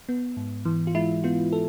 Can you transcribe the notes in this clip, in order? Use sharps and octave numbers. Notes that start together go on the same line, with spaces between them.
B3
G#2
E3
F4
G#3 E4
B3 F4
A4